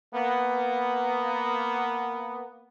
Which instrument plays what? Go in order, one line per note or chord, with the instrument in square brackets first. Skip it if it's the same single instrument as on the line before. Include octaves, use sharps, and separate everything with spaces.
[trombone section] A#3 B3